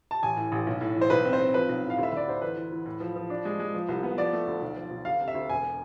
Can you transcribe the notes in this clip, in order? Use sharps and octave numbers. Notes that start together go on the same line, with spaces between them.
A5
A1 G#5
A2
A1
B1
A2
E3
C5
B1 B4
C4
C5
C4
F3 B4
B1
A2
F5
D2
E5
D3 D5
D2 C5
E3 B4
E3
E3
A2
F3
F3
D4
G#3
G#3
F3
C2
B3
F3 D5
A3
D2
B1
F3
B1
D2 F5
C3
E5
D2
E1 G#5